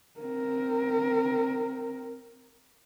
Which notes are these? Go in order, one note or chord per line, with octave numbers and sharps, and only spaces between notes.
C4 A#4